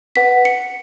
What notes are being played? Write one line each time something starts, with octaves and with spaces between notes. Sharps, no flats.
B4 F#5 B6
C#7